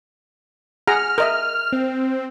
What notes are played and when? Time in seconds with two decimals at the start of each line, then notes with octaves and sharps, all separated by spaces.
0.88 G#4 F#5 A#5 F6
1.18 A#4 D#5 E5
1.72 C4